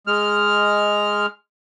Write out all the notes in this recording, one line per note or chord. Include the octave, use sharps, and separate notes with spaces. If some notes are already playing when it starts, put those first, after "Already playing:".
G#3 F6